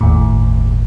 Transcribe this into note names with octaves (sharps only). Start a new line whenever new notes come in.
G1 D#2 A2